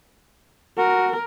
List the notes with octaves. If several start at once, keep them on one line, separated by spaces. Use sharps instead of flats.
F#4 A#4